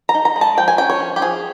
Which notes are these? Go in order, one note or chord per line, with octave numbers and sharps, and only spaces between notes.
A#5
D#4
A#5
G#3
A5
F3 G5
G#5
C#4 G5
C#5
F3
G4
F3 G#4